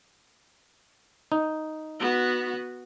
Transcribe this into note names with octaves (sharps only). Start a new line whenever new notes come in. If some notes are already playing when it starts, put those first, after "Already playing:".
D#4
B3 F#4